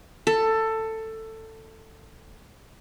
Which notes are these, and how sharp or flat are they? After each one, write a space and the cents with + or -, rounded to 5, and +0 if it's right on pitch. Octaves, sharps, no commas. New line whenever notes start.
A4 +15